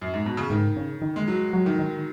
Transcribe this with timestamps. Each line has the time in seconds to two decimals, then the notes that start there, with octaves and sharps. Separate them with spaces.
0.01 F#2
0.14 G#2
0.26 B2
0.37 C#3
0.50 G#2 D#3
0.77 C#3
1.02 D#3
1.16 G#3
1.28 F#3
1.53 F#3
1.66 D#3
1.79 D#3